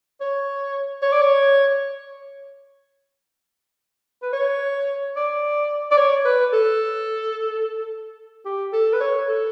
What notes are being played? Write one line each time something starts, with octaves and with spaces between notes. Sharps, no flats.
C#5
C#5
D5
C#5
B4
C#5
D5
D5
C#5
B4
A4
G4
A4
B4
C#5
A4